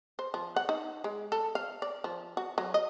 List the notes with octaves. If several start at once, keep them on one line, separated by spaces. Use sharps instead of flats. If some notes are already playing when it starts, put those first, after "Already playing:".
C5
F3
F#5
D#4
G#3
A4
F5
D5
F3
F#4
F#3
D#5